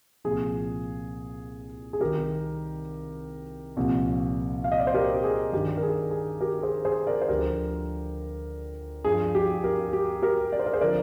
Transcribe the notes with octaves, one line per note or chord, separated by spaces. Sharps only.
C2 A#2 F3 G#4
G#4
C2 C3 D#3 G4 A#4
C2 A#2 F3
F5
D#5
D5
C5
G4 A#4
G4
G#4
G2 D#3 G4
A#4
G#4
G#4
G4 A#4
G#4 C5
G#4 C5
A#4 D5
C5
D2 D3 F3 G4 A#4
G2 F3 G#4
G4
G4 A#4
G4
G4 A#4
D5
C5
A#4
G#4 C5
D3 F3 A#4 D5